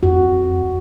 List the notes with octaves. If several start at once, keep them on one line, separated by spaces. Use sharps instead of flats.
F2 F#4